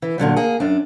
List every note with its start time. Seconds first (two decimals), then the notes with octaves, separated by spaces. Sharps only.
0.02 E3
0.18 A#2 D3 F#3 G3
0.36 A#3 G#4
0.60 F#2 D4